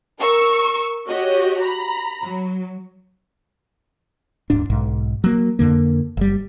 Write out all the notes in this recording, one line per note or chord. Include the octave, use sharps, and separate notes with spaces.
A#4 C#6 E6
F#4 G4 C#5 D#5
A#5 B5
F#3
D1 G#2 D4
B1 G#2
F#3 A#3
F2 D3 A#3
F#1 G3